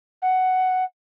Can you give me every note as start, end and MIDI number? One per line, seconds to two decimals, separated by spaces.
0.22 0.84 78